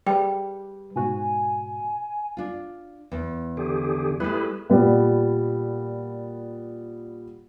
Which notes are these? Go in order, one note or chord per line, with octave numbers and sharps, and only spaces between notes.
G3 G#4 B4 G5
G#2 B2 F#4 G#5
D4 F4
E2
D3 G4 G#4
G3 A3 E4 G#4 B4
A#2 G3 B3